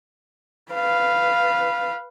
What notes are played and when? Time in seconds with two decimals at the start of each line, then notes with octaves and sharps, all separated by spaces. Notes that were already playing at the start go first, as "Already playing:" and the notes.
0.72 B4 F5